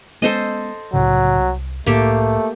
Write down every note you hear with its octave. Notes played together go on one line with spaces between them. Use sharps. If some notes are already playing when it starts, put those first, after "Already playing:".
G#3 B3 C#4 A4 C5 D#5
C2 A2 C#3 F#3
C2
C2 A2 A3 A#3 G4 A4